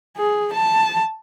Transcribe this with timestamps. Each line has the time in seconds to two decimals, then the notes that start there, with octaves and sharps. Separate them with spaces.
0.17 G#4
0.53 A5